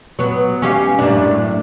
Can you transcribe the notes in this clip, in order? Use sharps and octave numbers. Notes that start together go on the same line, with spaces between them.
F#3 B3
C#4 G4 F5
F#2 A2 D4